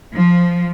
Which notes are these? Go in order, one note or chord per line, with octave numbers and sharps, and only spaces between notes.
F3